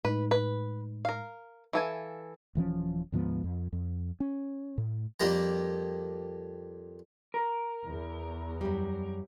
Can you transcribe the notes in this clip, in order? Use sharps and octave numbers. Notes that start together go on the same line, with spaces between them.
A2 G#3 D#4 B4
B4
A#4 F5
E3 A4 B4 E5 F5 G#5
D#1 E3 F3 C#4
D2 G#2 F3 B3
F2
F2
C#4
A2
F2 G3 A#3 A#5
A#4
E2
F#2 G3